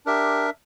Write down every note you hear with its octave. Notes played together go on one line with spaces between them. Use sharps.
D4 G4 A#4 E5